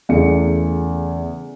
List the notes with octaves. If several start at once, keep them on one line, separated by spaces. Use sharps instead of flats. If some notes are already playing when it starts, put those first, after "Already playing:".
E2 C#3 A3 G#4 C#7